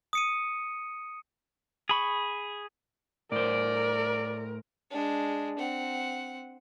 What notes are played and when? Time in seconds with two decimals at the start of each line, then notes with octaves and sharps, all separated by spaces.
0.13 D#6 C#7 D#7
1.89 G#4 B5 C#6
3.32 A2 A#4 C5 D5
4.90 G#3 D4
5.58 C4 F#5